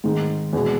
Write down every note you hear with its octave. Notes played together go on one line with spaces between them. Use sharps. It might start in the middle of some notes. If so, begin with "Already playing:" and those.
G#2 D#3 G#3
E2 B2 G#3